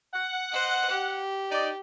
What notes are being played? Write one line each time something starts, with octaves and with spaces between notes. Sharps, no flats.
F#5
C5 D#5
G4
D#4 D5